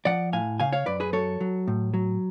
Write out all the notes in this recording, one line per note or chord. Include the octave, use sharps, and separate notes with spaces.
F3 D5 F#5
A2 F5 G#5
C#3 F5 G#5
C#5 F5
F#2 B4 D5
G#4 B4
F#3 A4 C#5
F#3
A2
F#3